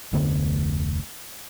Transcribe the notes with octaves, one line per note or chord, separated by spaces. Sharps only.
F1 D2 D3 B3